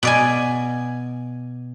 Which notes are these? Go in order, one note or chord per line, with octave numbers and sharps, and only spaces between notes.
B2 D5 G#5